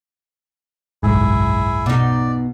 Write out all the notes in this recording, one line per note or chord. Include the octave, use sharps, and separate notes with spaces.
F#1 B1 G#2 E4 G#4
B2 D#4 D5